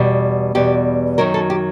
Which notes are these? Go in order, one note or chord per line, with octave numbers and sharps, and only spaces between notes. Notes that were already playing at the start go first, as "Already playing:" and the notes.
Already playing: E2 B2 G3
E2 B2 G3 G4
F#2 D#3 F#3 A#4
A4
G4